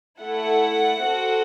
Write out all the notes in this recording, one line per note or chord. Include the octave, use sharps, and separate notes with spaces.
A3 E4 A4 F#5
C4 F#4 A4